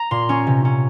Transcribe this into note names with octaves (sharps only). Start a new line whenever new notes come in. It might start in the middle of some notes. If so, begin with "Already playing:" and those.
Already playing: A#5
A#2 C6
C#4 C#6
C3
C#4